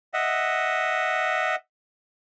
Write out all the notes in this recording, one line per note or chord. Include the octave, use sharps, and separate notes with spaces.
D#5 E5 F#5